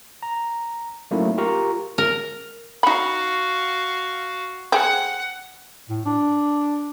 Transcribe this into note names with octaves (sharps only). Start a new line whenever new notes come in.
A#5
F#3 A3 A#3 C#4 D#4 E4
F4 G4 A#4 F5 A#5 C#6
A#4
D#4 F#4 F5 B5
C4 G#4 F#5
A2
D4